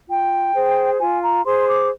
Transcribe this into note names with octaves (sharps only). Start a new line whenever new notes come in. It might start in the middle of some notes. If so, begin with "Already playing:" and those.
F4 G5
G#4 C5
F4 G#5
A#5
G#4 C5 C6
D6